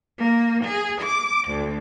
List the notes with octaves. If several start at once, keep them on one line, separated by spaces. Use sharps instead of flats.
A#3
G#4
D6
D2